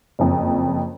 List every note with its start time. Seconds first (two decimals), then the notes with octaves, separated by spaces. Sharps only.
0.19 F#1 F2